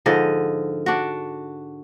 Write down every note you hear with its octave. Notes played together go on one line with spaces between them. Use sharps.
G#2 D3 F3 D#5
D4 F#4